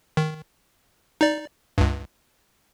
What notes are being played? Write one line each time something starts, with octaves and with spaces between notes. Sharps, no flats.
D#3
D#4 D5
C#2 G2